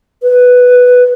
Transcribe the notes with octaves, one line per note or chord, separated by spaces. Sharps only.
B4